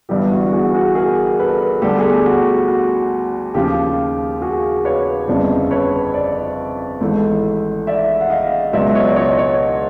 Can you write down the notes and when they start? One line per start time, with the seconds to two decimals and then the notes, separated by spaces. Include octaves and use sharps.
0.09 G1 G2 E3 G3 B3 G4
0.31 F#4
0.53 F#4 G#4
0.74 F#4 G#4
0.95 G#4 A#4
1.39 A4 B4
1.82 D2 D3 G3 B3 G4 A4
1.98 G#4
2.03 G4
2.26 F#4
2.47 G4
2.68 F#4
3.54 D#2 C#3 F3 G4
4.42 F#4 G#4
4.85 B4 C#5
5.28 G1 F2 C#3 C5 D5
5.71 B4 C#5
6.14 C5 D5
7.01 G#1 G#2 E3 A3
7.87 D5 E5
8.21 F#5
8.30 D#5 F5
8.73 C#2 B2 F#3 D5 E5
8.95 C#5 D#5
9.09 D5
9.16 C#5 D#5
9.38 C#5 D#5